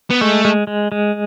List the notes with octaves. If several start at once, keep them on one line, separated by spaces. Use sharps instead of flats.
B3
G#3 A3
G#3
G#3
G#3